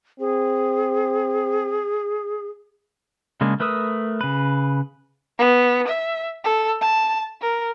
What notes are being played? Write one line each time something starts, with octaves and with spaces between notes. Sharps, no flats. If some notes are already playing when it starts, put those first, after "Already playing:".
C4 G#4
C#3 G#3 A#3 D4
A3 A#4 B4 D#6 E6
C#3 B4
B3
E5
A4
A5
A#4